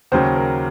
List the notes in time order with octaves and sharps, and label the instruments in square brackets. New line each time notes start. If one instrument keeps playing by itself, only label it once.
[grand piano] D#2 C#3 F#3 C5
A#4